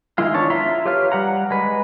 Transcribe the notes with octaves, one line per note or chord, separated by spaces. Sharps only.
D#3 G#3 E4 F4 F5
B3 D4 C#5 A5
F4 E5 A#5 C6
G4 B4 C#5 F5 F6
G3 F#5 A#5
G#3 B4